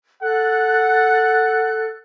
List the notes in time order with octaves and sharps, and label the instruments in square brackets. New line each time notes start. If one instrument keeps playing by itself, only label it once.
[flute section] A4 F#6 [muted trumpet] F#5